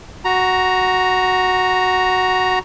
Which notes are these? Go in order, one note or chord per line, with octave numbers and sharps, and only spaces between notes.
F#4 A#5